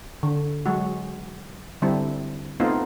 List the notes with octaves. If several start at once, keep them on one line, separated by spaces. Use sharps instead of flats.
D3
F#3 G#3 F#4
D3 G3 C4 D4 E4
A3 B3 C4 D#4 F4